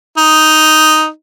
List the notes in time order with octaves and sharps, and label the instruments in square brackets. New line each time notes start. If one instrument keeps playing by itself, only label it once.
[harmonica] D#4